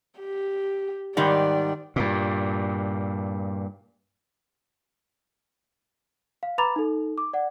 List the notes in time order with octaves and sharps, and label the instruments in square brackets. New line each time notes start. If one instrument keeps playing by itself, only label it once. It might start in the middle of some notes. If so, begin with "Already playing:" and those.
[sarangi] G4
[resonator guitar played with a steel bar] G#2 D#3 G3 [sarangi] D5
[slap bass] G2 A#2
[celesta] F5
B4 A#5 B5 D6 A6 F7
D#4 A4
D6
D5 F#5